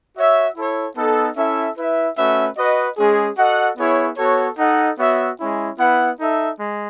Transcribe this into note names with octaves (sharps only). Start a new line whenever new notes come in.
F#4 C#5 E5
E4 A4 C#5
B3 D#4 A4
C#4 E4 A4 E5
E4 B4 E5
A3 C#4 F#4 B4 E5
F#4 B4 D#5
G#3 C#4 G#4
F#4 A4 D#5 F#5
B3 E4 G#4 C#5
B3 F#4 A4 C#5
D#4 A4 D#5 F#5
B3 F#4 C#5 E5
G#3 C#4 E4
B3 E4 B4 F#5
D#4 A4 E5
G#3